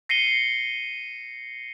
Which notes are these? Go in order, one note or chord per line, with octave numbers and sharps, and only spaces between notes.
A#6 C7 C#7 D#7 G7